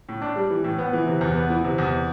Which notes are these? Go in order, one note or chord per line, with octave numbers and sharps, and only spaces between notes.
A2
D4
G3
E3
A2
B3
E3
C3
E2
B3
E3
C3
E2